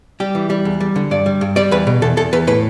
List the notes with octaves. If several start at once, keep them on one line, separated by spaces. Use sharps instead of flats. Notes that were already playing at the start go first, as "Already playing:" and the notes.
G3 G4
E3
G3
E2
G3
D3
G2 D5
G3
G2
G3 D5
E2 B4
B2
E2 A4
E2 A4
E2 B4
A2 B4